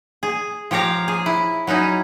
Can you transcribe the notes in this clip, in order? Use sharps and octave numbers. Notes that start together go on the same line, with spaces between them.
G#4
F3 G4 C#5 F5 A#5
G#4
E4
F#3 C#4 D#4 E4